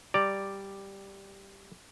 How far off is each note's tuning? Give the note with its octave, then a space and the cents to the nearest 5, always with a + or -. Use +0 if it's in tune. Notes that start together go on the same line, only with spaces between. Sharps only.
G3 +0 D5 +0 A#5 -15